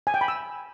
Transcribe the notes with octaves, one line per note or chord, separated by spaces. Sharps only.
G#5
G5
B5
E6